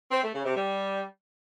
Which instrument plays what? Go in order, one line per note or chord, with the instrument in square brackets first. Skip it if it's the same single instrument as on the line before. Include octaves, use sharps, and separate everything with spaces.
[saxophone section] C4
A3
C#3
C3
G3